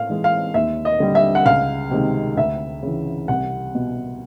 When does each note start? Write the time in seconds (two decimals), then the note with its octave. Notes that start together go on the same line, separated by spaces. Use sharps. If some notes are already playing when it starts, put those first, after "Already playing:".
Already playing: A2 F5
0.10 E3 G#3
0.24 F5
0.54 D#2 E5
0.85 D#5
1.00 D3 G3
1.15 E5
1.35 F#5
1.46 C#2 F5
1.91 C3 D#3 G#3
2.37 D2 E5
2.83 C#3 E3
3.28 C2 F#5
3.75 B2